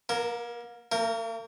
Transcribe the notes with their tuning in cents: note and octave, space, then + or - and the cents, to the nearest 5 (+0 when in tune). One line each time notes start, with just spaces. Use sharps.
A#3 +35 A#4 -10
A#3 -45 A#4 -5